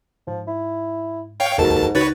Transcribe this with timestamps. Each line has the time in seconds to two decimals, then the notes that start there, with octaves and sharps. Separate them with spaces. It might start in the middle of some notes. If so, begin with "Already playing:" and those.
0.27 G#2 F3
0.48 E4
1.40 C#5 F5 G5
1.58 D#2 G#2 F#4 A4 A#4 A5
1.95 C#2 D#4 F#4 B4 C#5 A6